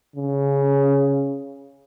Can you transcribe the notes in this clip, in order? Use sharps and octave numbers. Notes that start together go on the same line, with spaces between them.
C#3